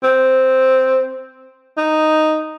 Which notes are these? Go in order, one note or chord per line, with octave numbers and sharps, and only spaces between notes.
C4
D#4